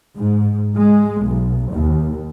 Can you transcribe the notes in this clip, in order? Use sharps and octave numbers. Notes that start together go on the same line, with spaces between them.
G#2
G#3
B1
D#2